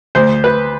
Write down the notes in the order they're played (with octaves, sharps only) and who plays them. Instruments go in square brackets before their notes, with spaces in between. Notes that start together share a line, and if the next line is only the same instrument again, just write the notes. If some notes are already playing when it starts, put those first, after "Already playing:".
[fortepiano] D2 C5
B4